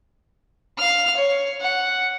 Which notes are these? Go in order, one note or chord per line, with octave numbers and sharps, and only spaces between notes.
F5 F6
C#5
F#5